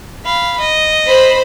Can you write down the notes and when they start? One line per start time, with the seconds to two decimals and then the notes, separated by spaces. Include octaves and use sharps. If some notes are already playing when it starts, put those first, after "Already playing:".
0.24 F5 B5
0.60 D#5
1.07 C5 B5